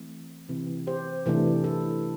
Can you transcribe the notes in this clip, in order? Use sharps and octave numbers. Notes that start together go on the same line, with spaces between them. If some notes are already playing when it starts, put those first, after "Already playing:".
Already playing: E3 A3 C4
C3 E3 C4
G4 C5
C3 E3 A3 D4
E4 A4